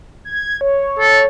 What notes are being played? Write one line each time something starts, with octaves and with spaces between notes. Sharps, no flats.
G#6
C#5
A4